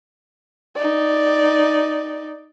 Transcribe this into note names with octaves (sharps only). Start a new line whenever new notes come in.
D#4 D5